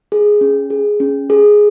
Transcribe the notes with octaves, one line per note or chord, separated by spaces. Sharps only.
G#4
C#4
G#4
C#4
G#4